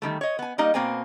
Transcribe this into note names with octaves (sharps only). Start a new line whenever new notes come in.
D#3 G3 A3
C#5 D#5
B3 G#5
G3 A#3 D#4 D#5
B2 A#3 C4 G#5